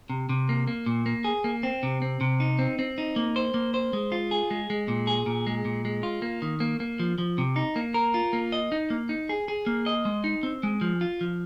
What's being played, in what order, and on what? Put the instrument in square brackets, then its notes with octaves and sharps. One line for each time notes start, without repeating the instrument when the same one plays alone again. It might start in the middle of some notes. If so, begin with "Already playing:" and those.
[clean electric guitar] C3
C3
A#3
A#3
A#2
A#3
G#4
A#3
C4
C3
C4
C3
D#4
C4
C4
D#4
A#3
C5
A#3
C5
G#3
F4
G#4
G#3
G#3
A#2
G#4
A#2
G#3
A#2
G#3
F4
A#3
D#3
A#3
A#3
F3
F3
C3
D#4
A#3
A#4
F4
A#3
D#5
D#4
A#3
D#4
G#4
G#4
A#3
D#5
G#3
D#4
C4
G#3
F3
F4
F3